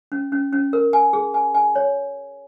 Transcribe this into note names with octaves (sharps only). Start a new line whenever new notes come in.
C#4
C#4
C#4
A#4
G#5
G#4
G#5
G#5
C#5